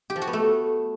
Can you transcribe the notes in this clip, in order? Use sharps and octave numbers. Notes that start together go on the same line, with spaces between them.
G4
F3
F#4
B3
A3